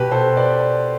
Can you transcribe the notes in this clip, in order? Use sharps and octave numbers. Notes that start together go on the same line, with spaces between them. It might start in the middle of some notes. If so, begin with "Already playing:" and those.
Already playing: B2 G4 B4
A4 C5
B4 D5